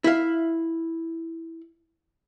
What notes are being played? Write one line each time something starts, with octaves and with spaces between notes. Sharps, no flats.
E4 F5